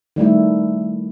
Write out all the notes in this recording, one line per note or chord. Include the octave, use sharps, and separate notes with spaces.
D#3 G3 A3 E4